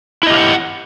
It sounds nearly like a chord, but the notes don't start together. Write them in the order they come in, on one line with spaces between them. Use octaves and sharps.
E4 D#5 G4 F5 F#5